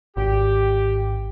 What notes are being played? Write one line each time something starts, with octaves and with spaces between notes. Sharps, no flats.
G#1 G4